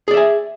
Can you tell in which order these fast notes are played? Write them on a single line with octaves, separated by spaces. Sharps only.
G#4 D5 E5 G#5